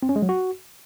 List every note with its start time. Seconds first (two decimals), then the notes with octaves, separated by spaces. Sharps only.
0.03 C4
0.09 C#4
0.16 G#3
0.22 F#3
0.29 F#4